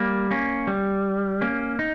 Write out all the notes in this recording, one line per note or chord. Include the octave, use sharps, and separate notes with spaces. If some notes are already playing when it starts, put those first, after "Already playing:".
Already playing: G3 A#3
A#3 C#4
G3
A#3 C#4
D#4